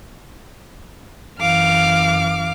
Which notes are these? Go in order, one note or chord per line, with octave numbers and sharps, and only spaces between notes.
F#2 E3 F5 D6 F6